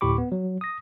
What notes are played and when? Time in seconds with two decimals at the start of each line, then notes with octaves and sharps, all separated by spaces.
0.01 D2 A2 G4 B5 C#6 D6
0.18 B3
0.32 F#3
0.61 D#6 A#6